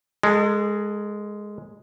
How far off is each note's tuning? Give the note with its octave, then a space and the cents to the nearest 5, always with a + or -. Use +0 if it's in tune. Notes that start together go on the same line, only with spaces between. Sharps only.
G#3 +0 A4 +35